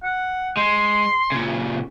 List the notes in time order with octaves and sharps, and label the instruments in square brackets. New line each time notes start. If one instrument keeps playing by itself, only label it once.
[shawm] F#5
[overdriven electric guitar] G#3 [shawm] C6
[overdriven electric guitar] A#2 C#3